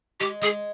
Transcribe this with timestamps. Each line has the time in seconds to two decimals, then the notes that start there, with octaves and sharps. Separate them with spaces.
0.20 G#3 G4
0.42 G#3 G#4